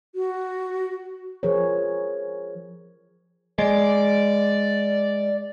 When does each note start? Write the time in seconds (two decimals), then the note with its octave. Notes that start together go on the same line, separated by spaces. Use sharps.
0.15 F#4
1.43 F3 G#4 A#4 C5 C#5
3.59 G#3 D5